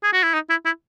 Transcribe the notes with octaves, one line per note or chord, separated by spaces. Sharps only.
G#4
F#4
E4
D#4
E4
E4